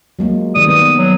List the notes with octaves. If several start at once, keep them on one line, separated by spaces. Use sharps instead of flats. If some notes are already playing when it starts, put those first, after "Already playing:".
F#3 G#3 A#3
D#3 G3 D5 D#6
B3
F#3